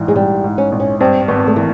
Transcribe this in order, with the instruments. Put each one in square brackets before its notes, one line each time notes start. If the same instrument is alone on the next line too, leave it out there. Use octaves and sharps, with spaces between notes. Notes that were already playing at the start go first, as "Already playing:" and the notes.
Already playing: [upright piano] A#1 G#2 E3
[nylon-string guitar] G#3
[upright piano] A#1 [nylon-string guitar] G3
[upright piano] G#2
[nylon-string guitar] C#4
[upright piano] A#1
[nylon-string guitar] C#4
[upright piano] G2 [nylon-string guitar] C4
[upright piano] G#1 [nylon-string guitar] B3
[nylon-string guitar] A3
[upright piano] E3 [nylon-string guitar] A#3